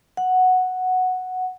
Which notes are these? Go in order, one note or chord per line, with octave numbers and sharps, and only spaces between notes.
F#5